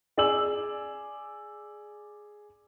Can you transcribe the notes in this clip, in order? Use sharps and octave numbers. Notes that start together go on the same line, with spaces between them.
G#4 D5 G#5 E6 F#7